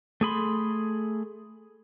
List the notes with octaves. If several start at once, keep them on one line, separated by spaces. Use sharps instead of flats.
A3 G#4 B5 C6